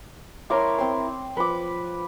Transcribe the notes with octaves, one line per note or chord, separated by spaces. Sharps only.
E4 A#4 C#5 C6 D6
C4 C6
F3 B4 D6